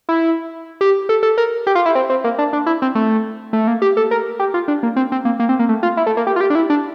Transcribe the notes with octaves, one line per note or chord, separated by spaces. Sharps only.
E4
G4
A4
A4
A#4
G4
F4
E4
C4
C4
A#3
D4
D4
E4
C4
A3
A3
A#3
G4
A4
A#4
G4
F4
D4
A#3
C4
C4
A#3
A#3
C4
A#3
A3
F4
E4
A3
A#3
G4
F4
G4
D4
E4
D4